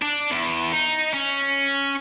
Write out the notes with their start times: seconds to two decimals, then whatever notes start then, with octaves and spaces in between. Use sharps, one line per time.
0.02 D4
0.31 E2
0.72 D#4
1.14 C#4